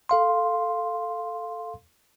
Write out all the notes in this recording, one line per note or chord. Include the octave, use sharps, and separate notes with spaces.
A4 F5 C6